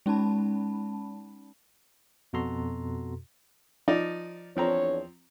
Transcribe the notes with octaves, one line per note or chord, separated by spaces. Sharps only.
G#3 C#4 D#4 A5 B5
F2 B2 F#4 A4 A#5 C6
F3 D#4 D5
E2 F3 C4 D4 C#5 A#5